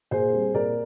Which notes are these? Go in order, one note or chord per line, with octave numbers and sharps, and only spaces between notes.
A#2 G#4 C5
G3 C4
A#2 A#4 D5